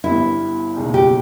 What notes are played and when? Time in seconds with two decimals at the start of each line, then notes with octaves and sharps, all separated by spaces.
0.04 G1 G2 G3 B3 E4
0.76 E1 D#2 C#3 G#3 D#4
0.94 G4